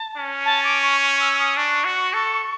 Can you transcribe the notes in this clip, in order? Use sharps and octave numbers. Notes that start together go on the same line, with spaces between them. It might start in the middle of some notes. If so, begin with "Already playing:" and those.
Already playing: A5
C#4
A5
D6
C#6
C#6
E6
D#6
D4 C#6
F#4
A4